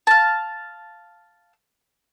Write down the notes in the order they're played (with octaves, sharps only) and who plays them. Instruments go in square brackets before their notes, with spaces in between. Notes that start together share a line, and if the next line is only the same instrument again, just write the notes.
[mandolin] F5 A5